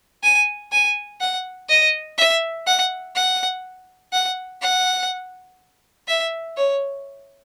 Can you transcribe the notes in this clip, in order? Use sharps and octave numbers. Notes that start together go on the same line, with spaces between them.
G#5
G#5
F#5
D#5
E5
F#5
F#5
F#5
F#5
E5
C#5